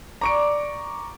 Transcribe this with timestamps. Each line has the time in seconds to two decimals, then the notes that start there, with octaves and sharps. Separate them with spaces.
0.21 D5 A#5 C#6 D7